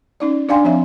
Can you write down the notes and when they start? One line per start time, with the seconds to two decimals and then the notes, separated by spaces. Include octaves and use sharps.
0.20 C#4 D#4 D5
0.49 D4 D5 F5 G5 G#5 C6
0.64 F3 C4 C#5 E5